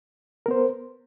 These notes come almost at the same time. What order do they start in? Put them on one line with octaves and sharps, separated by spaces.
A#4 B3 C5